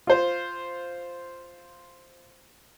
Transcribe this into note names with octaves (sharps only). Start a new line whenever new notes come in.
F4 C5